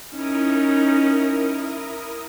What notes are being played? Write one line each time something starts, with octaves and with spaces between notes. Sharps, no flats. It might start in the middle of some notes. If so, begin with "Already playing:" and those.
C#4 D#4 E4 A#4 D#6